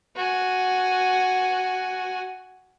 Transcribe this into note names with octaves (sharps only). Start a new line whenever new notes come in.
F#4 G#5